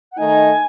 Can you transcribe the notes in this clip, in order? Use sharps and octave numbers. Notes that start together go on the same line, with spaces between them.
F#5
D#3 A3 D#4 G#5